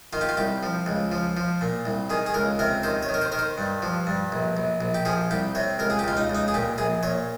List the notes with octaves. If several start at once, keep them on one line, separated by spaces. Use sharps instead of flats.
D#3 F4
G4
F4
C2 G4
F3
C#2
F3
F3
A#2
C2
D#3 G#4
G#4
C#2 A#4
C3 A#4
D#3 C5
C#5
D#3
A#4
C5
D#3 A#4
C5
G2
F3
G2
A#1
A#1
A#1
G4
F3 G#4
C2 G4
C3 C#5
C#2 A#4
G#4
G4
C#2 F4
D#4
C#2
D#4
G#4
A#2 G4
A#1 G#4
A#2 C#5